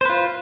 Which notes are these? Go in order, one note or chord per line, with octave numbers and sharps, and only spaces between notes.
F4 B4 C5